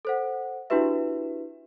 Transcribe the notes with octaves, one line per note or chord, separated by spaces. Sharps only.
A4 C5 F#5
D4 E4 F#4 G4 B4 E5